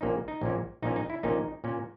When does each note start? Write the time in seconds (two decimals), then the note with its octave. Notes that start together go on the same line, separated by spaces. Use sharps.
0.01 A#1 A#2 A#3 C#4 D#4
0.28 D#4
0.41 A#1 A#2 A#3 C#4
0.82 A#1 A#2 A#3 C#4 D#4
0.96 D#4
1.10 E4
1.23 A#1 A#2 A#3 C#4 D#4
1.64 A#2 A#3 C#4